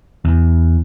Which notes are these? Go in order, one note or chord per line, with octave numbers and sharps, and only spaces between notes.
E2